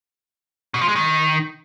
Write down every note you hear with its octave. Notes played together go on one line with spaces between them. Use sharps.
B2
F3
G#3
D#3